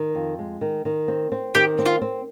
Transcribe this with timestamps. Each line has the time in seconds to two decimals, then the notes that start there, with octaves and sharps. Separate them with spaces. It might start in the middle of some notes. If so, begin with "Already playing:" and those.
Already playing: D#3
0.15 F2
0.39 G#3
0.61 D#3
0.85 D#3
1.08 C4
1.32 C4
1.55 D#3 G4
1.79 C4
1.86 F4
2.02 C4